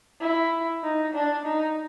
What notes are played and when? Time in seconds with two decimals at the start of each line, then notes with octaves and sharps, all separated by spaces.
0.21 E4
0.83 D#4
1.14 D4
1.45 D#4